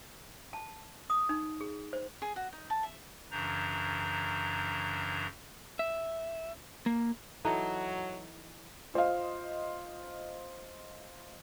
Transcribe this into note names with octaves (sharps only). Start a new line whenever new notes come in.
A5
D#6
D#4
G#4
C5
G#4
F#4
D#4
A5
E5
F#2 C#3 E3 D4 A#5 G6
E5
A#3
E3 F#3 D#4 A4
F4 C5 D#5 F5